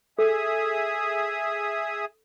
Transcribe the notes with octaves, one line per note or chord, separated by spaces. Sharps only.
G#4 A4 E5 D#6